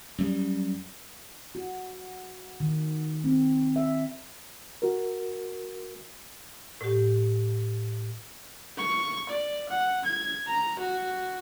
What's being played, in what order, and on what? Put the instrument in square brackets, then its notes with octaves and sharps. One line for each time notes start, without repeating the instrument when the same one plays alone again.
[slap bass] F#2 G3
[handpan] F#4
D#3
C4
E5
[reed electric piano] F#4 A#4
[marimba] A2 G4
[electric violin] C#6
D5
F#5
G#6
A#5
F#4